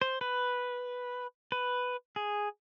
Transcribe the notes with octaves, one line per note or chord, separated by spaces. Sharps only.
C5
B4
B4
G#4